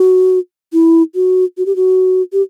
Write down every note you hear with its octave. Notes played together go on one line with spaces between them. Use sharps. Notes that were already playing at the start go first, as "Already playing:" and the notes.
Already playing: F#4
E4
F#4
F#4
G4
F#4
G4